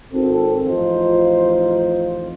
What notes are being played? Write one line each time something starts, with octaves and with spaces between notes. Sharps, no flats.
G#1 C4 A4
A1 F2 C4 D#4 F4 C5